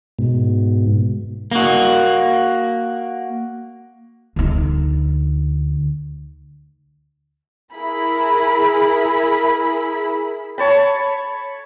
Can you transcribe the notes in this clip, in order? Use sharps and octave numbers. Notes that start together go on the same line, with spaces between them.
G#2 B2
A#3 F#4
D2 D#4
E4 G#4 A#4 B5
C#5 A5 B5